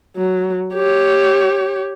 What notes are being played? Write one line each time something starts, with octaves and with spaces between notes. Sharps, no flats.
F#3
G4 C#5